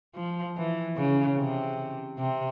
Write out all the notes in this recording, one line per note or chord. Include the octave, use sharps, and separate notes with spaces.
F3
E3
C#3
C3
C3